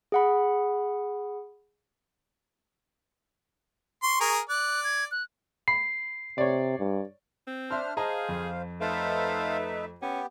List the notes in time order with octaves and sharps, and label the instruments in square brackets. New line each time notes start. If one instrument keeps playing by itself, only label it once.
[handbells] G#4 F#5 B5
[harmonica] C6 [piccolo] C#6
[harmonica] G#4 A#4
[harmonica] D5 [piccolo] F#6
[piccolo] G#6
F#6
[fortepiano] B5 [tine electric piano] C7
[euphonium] C3 [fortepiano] C#5 D5
[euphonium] G2
[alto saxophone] C4
[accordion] D4 C5 F6 [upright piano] E5 C6
[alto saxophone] G#4 [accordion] C5 F5 [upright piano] D#5 A5 A#5
[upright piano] F2
[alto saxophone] A3 [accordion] D#4 B4 E5 [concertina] A4 C5 F5
[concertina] B3 G4 [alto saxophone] C#4